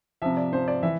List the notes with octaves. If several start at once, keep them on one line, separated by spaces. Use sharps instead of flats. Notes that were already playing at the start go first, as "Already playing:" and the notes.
C3 F3 E5
D5
C3 F3 C5
D5
E3 E5